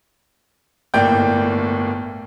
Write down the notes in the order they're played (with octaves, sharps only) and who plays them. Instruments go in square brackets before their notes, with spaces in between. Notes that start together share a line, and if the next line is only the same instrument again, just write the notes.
[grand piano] G1 A2 A#3 D5 G5 G6